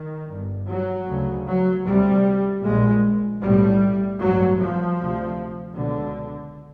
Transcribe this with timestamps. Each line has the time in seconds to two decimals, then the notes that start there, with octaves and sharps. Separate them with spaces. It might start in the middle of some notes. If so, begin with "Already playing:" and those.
Already playing: D#3
0.30 G1 G2
0.69 F#3
1.08 D2 C#3
1.47 F#3
1.86 D2 C3 G3
2.63 A#1 A#2 G#3
3.42 B1 A2 G3
4.20 A1 G2 F#3
4.59 F3
4.98 D2 C3
5.76 C#2 B2 D3